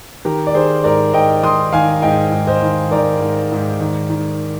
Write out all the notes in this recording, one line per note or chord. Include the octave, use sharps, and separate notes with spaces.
D#3 G4 A#4
D5
D#3 G#4 C5
G#2 A#4 D5
G#2 D#5 G5
D#3 C6 D#6
D#3 F5 G#5
G#2 D#5 G5
G#2
C5 D#5
D#3
D#3 A#4 D5
G#2
G#2
D#3
D#3